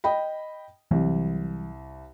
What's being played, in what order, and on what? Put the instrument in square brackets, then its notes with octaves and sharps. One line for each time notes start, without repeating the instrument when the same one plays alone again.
[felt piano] D#5 G5 B5
[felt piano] C2 [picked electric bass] E3 F#3 G3